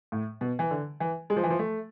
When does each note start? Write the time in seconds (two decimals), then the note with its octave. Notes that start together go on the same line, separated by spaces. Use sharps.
0.12 A2
0.41 B2
0.59 E3
0.71 D3
1.00 E3
1.30 G#3
1.36 F3
1.44 E3
1.50 F3
1.59 A3